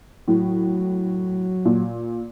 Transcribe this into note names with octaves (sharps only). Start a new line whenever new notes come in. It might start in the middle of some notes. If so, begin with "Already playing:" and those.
A2 F#3
A#2